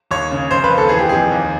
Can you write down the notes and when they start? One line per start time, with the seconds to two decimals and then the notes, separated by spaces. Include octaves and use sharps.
0.11 D#2 C#5
0.31 C#3
0.51 F1 C5
0.64 B4
0.70 D#2
0.78 A4
0.89 E3 G#4
0.99 G4
1.09 F2 G#4
1.32 D#2